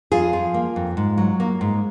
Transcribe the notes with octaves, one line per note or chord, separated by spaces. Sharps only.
F2 F4 G#4
F3
A#3
F2
G#2
F#3
A#3
G#2